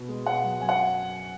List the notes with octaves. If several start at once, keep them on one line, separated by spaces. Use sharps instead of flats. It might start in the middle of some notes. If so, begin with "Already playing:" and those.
Already playing: B2
G#3
B2 F#5
F#3
F#2 G#5
F#5